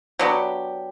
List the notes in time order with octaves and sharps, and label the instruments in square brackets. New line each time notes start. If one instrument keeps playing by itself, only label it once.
[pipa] F#3 B3 D4 G4